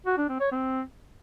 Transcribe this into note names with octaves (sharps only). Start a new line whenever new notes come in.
F#4
D4
C4
C#5
C4